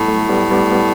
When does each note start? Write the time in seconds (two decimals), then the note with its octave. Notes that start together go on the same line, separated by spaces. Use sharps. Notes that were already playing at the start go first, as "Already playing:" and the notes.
Already playing: A2 G3 B3
0.08 F#3 A3
0.29 G3 B3
0.51 G3 B3
0.72 G3 B3